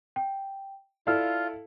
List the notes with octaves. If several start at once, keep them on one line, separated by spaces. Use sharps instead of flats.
G5
E4 F4 A4 D5 F5 F6